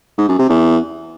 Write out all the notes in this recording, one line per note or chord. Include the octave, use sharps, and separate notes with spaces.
G#2
F#2
C3
E2